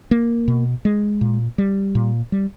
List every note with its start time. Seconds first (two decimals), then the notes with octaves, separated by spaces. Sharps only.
0.11 A#3
0.48 B2
0.85 G#3
1.21 A#2
1.58 G3
1.95 A#2
2.32 G3